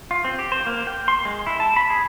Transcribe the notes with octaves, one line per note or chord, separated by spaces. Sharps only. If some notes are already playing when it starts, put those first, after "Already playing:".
F4
C4
G4
C5
A#3
G5
C6
G#3
E4
A5
B5
G#4